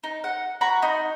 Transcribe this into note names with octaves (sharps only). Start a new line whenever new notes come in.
D#4
F#5
F#4 F#5 A#5 B5
D#4